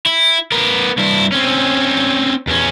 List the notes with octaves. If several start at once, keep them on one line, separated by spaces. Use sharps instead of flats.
E4
B3 A#4
G2 E4
C4 C#4
E2 C#4